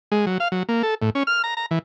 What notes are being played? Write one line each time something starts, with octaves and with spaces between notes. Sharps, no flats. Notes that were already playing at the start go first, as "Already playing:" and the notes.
G#3
F#3
F5
F#3
A#3
A4
A2
C#4
F6
A#5
A#5
E3